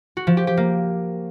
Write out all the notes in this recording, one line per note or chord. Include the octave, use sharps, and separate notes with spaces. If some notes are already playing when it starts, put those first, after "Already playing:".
F#4
F3
G4
G4
A#3